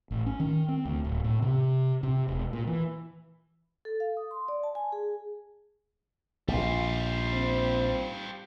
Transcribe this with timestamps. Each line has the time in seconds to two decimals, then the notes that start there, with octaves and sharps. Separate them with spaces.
0.11 A1
0.26 C#4
0.40 D#3
0.68 C4
0.85 D2
1.05 D1
1.24 A2
1.42 C3
2.03 C3
2.28 E1
2.53 A#2
2.67 E3
3.85 A4
4.00 F5
4.17 D#6
4.31 C6
4.48 D5
4.63 A5
4.75 G#5
4.92 G#4
6.48 A#1 G3 F4
7.33 C4